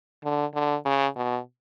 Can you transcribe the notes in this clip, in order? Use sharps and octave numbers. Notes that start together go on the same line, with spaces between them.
D3
D3
C#3
B2